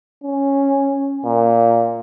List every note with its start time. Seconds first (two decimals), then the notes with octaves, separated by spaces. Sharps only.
0.24 C#4
1.25 A#2